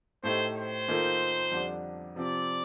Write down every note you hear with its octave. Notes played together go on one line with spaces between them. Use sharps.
A2 A3 D#4 G4 C5
C5
D#3 A#3 F4 A4
F2 D3 G3 D4
C3 F3 C4 D5